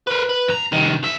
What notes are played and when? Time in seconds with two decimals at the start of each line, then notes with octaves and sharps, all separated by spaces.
0.07 A#4 B4
0.29 B4
0.48 G2 A#5
0.72 C2 D#3
1.03 C2 E5